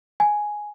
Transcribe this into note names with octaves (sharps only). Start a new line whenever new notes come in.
G#5